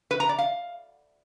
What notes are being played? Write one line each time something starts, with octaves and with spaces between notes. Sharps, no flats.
B4
A#5
D5
F5